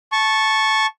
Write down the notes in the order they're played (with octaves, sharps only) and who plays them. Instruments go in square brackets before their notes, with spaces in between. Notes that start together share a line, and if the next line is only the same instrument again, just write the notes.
[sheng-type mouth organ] A5 C#6